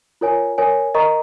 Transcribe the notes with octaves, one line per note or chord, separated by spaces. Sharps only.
F4 A#4 C#5 G#5
A#4 C#5 G#5
A#4 D#5 A#5 C#6